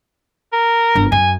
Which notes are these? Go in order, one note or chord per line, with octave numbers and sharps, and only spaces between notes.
A#4
G1 D4
F#2 G#5